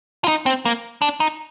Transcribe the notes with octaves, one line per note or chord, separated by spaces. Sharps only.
F4
D#4
C4
A#3
D4
D#4